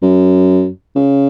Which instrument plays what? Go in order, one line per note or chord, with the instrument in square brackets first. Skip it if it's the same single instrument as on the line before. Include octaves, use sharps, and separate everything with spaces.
[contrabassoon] F#2
C#3